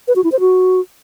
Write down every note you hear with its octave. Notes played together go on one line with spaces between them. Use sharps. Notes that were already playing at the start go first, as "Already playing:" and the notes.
B4
F#4
E4
C5
F#4